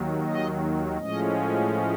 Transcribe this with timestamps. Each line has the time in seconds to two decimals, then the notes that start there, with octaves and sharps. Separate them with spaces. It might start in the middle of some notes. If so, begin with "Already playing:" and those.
Already playing: D#2 D#3 F#3
0.26 D#5
0.98 A2 F3 G#3 C#4 D#5